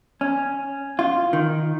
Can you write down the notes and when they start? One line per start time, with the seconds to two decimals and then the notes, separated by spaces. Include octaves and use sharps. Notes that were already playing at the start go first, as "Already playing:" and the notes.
0.21 C#4
0.99 F4
1.33 D#3